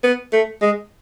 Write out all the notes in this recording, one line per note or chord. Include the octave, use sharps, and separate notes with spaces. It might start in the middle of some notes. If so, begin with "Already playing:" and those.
B3
A3
G#3